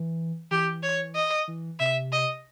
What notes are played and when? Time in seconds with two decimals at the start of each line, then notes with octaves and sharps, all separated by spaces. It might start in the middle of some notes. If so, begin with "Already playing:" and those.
Already playing: E3
0.51 E3 G4
0.83 C#5
1.15 D#5
1.48 E3
1.79 C3 E5
2.12 D#5